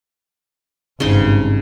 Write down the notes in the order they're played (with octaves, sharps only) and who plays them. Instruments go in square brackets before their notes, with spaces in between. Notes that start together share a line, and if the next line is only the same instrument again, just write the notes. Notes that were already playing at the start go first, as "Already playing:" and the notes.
[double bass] G#1 G2 [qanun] C#3 D#4 C6